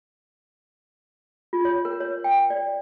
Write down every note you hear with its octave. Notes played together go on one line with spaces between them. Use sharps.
F4
C#5
A#4
C#5
G5
D5